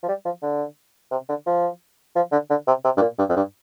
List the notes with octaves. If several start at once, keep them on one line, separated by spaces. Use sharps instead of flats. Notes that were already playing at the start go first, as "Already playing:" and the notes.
F3
G3
F3
D3
C3
D3
F3
F3
D3
D3
C3
C3
G2
A#2
G2
F2
G2